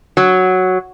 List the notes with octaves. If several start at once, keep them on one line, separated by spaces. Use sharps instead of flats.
F#3